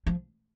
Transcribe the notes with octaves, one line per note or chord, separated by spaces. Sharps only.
F3